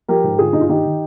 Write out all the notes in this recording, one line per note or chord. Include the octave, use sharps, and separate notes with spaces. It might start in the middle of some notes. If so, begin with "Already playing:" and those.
F3 G4 A#4
G#2
D3 F4 G#4
G2 D#4
F4
D#3 D#4 G4
D#3